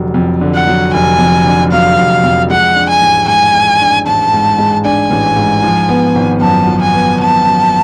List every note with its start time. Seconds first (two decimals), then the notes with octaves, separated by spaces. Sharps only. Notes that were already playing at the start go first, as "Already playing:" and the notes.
Already playing: F1 D3 F#3
0.14 F2
0.41 D3
0.54 F#5
0.67 F#3
0.93 F1 G#5
1.19 F2
1.45 D3
1.72 F#3 F5
1.98 F1
2.23 F2
2.50 G#3 F#5
2.76 D4
2.89 G#5
3.02 A1
3.28 G#2 G#5
3.54 G#3
3.81 D4
4.06 A1 A5
4.33 G#2
4.58 G#3
4.85 D4 G#5
5.11 A1
5.36 G#2
5.64 F3
5.89 B3
6.15 G#1
6.41 F#2 A5
6.67 F3
6.81 G#5
6.94 B3
7.19 G#1 A5
7.45 F#2